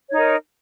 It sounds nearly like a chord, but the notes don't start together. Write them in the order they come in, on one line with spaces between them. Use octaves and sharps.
C#5 D#4 A#4